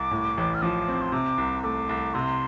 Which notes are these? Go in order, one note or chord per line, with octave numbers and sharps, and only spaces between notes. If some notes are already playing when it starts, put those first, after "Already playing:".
Already playing: C2 D6
A2
A1
F6
F3 D6
C4
C6
C3 D6
C2
A3 D6
C2
C3 C6